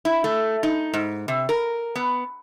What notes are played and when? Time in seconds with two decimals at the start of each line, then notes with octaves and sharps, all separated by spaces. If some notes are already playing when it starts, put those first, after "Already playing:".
0.05 E4
0.24 A3
0.63 D#4
0.94 G#2
1.28 C3
1.49 A#4
1.96 B3